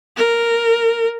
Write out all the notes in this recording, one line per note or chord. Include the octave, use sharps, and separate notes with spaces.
A#4